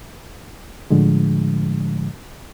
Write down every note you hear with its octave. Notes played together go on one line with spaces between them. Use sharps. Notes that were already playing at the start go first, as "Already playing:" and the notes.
A2 D3 F3 G#3